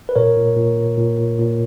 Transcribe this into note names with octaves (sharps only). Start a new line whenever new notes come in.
B4
A#2 A#4 C#5
A#2
A#2
A#2
A#2
A#2
A#2